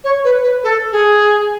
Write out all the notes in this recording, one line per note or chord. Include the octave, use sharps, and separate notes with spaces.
C#5
B4
B4
A4
G#4